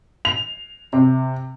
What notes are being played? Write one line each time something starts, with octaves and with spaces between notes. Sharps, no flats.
F7
C3